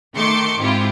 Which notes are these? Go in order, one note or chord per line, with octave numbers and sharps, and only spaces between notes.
D#3 A3 C6 D6 C#7
G#2 C4 E4 F4 G4